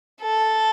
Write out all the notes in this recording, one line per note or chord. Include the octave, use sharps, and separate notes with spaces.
A4